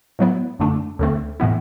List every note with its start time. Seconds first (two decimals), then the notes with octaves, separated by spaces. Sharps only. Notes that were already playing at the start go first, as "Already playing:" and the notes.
0.19 A2 F#3 B3 E4
0.59 F#2 D3 A3 D4
0.99 D2 D3 A3 C4
1.40 A2 E3 B3 E4